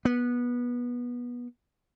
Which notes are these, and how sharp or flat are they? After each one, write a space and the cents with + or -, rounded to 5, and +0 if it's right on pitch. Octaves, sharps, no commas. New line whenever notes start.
B3 -20